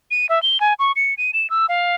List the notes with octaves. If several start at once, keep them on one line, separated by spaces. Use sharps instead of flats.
D#7
E5
G7
G#5
C#6
C#7
D#7
E7
E6
F5